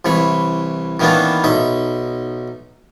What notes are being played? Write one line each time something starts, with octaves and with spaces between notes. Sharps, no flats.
C2 E3 C#5 B5
D#3 E3 A#3 B3 C#4 D4
B1 D#4 E5